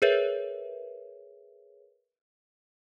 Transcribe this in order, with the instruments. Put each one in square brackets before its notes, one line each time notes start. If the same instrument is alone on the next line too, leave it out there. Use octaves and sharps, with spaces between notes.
[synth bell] G#4 A#4 B4 C#5 E5